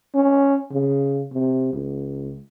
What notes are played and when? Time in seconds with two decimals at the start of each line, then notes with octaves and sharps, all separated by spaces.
0.15 C#4
0.72 C#3
1.33 C3
1.73 C#2